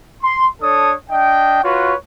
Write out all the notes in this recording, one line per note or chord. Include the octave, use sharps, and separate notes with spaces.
C6
D4 A4 C#5 D#6
D4 D#5 G5
F4 F#4 B4 C#5